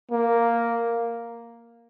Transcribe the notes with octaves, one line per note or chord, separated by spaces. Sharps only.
A#3